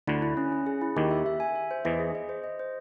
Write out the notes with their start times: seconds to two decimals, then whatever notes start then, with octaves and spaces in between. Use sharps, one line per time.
0.07 D2 D3 E4
0.22 E4
0.37 C#4
0.52 C#4
0.66 G#4
0.81 E4
0.96 D#2 D#3 G4
1.11 E5
1.26 E5
1.40 G#5
1.55 E5
1.71 C5
1.84 E2 E3 D#5
1.99 G#4
2.15 D#5
2.29 C5
2.44 D#5
2.59 C5